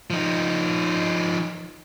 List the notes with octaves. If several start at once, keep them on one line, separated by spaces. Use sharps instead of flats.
F3 D#4